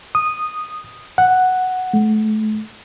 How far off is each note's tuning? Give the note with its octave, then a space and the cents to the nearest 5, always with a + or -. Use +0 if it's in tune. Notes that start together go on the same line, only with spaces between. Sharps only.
D#6 -10
F#5 +0
A3 -30